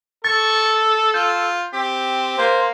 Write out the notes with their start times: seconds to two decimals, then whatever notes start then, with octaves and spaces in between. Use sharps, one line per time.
0.25 A4 C#6 A6
1.14 F4 G6
1.73 C4 G4
2.38 A#3 C5